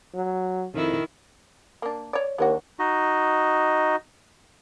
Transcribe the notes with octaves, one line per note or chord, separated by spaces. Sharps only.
F#3
F2 D#3 E4
A#3 D4
C#5 D5
D#2 F#3 D4 F#4
D#4 F#4 D#5